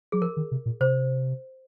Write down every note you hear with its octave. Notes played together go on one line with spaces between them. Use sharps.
F#3 G#4
F3 A#4
D#3
C3
A#2
C3 C5